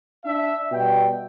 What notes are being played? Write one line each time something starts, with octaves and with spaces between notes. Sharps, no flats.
D4 E5
B2 G3 G5